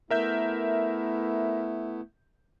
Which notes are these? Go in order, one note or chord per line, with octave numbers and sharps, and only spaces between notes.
A3 B3 E4 A#4 E5 G6